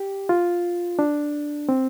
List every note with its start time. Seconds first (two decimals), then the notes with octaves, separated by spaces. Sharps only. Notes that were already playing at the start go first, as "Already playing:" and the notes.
Already playing: G4
0.29 F4
0.99 D4
1.69 C4